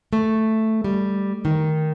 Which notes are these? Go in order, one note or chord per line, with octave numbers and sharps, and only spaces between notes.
A3
G3
D#3